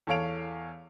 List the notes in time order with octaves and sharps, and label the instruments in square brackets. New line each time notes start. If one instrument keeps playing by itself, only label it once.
[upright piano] E2 A4 C#5 F5 D7 F7